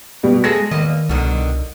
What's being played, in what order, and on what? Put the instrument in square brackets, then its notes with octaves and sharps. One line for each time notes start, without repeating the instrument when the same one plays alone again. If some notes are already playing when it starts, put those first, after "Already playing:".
[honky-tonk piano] B2 G3
[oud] G#3 G#4 A4 [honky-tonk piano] A#6
[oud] E2 A#3 D#5 [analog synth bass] D#3
[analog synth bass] C2 [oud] B2 D3 D#3